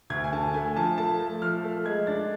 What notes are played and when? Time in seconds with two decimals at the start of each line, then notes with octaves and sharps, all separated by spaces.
0.10 D2 G#6
0.24 G#5
0.33 D3 A5
0.54 A3 G#5
0.76 F3 A5
0.98 A3 A5
1.20 A3
1.42 F3 F6
1.64 A3
1.85 G#3 G#6
2.07 D4 A6